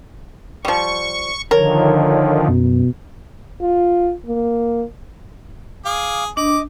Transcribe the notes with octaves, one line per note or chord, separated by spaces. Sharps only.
F3 G3 C#6
D3 D#3 F3 A#4 C#5
F#2 B2
F4
A#3
G#4 F5 D6
D4 D#5 D6